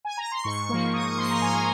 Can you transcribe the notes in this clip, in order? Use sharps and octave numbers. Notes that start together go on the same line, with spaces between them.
G#5
A#5
C6
G#2 C#6
F3 A#3
G#2 D#6
C#6
F3 A#3 C6
A#5
G#2 G#5